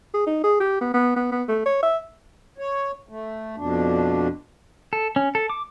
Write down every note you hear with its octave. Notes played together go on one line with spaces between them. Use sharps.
G#4
D#4
G#4
G4
B3
B3
B3
B3
A3
C#5
E5
C#5
A3
F2 B2 D4
A4
C#4
A4
D6